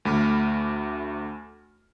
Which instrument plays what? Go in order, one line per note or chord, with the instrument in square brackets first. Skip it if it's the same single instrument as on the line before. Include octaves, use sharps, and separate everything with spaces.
[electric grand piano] D2 A3 B5 D6 F6